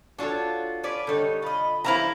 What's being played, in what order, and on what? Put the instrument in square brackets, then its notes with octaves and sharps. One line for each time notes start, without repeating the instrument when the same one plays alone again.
[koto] D4 A4 C#5 [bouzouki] F4 F#4
[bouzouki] C#4 B4 D5
[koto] D3 [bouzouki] G3 D#4 [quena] C#5
[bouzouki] F4 D#5 [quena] B5
[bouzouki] E3 G3 C5 [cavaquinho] E4 F5 A#5